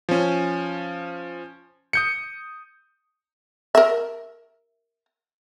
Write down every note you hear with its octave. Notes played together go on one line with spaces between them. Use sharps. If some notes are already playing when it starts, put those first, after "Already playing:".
F3 C#4
D#6 G6 C#7
A#4 E5